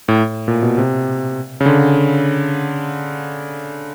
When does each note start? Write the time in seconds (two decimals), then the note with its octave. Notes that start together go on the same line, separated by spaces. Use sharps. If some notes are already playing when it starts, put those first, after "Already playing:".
0.08 A2
0.48 A#2
0.63 B2
0.78 C3
1.61 C#3
1.66 D3